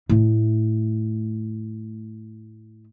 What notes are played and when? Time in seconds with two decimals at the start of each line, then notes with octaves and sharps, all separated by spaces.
0.09 A2 A3